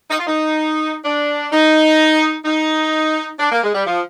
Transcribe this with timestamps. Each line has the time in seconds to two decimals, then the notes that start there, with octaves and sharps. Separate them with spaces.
0.11 D#4
0.19 F4
0.27 D#4
1.05 D4
1.53 D#4
2.45 D#4
3.40 D4
3.52 A#3
3.64 G#3
3.75 G3
3.86 F3